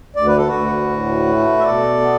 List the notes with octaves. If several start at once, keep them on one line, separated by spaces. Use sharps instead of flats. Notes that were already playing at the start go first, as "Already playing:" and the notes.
D2 D5
B4
A4
F#4 B4
D2
A2
A3
E5
B2 A4 D5
B3